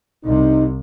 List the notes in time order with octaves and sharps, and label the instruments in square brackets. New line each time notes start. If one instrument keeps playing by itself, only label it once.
[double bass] C2 C3 [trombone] D#4